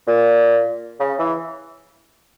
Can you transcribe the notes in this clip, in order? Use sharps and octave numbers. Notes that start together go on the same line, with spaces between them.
A#2
C#3
E3